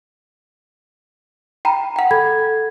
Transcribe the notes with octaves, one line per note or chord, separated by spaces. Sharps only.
G5 A#5 B5
F#5 G5
A4 B5 G#6